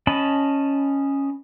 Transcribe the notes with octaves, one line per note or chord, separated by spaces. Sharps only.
C#4 D#5 A5 B5